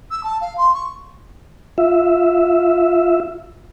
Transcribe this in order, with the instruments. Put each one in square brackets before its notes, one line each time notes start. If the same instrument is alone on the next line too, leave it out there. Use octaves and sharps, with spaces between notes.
[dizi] E6
A5
F5
C6
C#6
[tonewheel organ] F4 E5